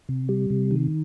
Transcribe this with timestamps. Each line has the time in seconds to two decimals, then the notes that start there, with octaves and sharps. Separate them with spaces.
0.09 C3
0.29 G3
0.50 C3
0.71 D#3